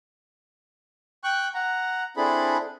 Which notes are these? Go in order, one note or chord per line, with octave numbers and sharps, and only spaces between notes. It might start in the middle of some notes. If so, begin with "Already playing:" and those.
G5 C#6 F#6
F#5 A#5
C4 D4 E4 G#4 A4 B5